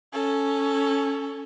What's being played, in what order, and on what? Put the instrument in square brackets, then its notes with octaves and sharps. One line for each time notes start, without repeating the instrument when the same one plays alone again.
[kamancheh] C#4 A4